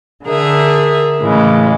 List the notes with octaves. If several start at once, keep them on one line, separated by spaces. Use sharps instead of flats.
D3 G#4 A#4 E5
A2 C#3 E3 G#3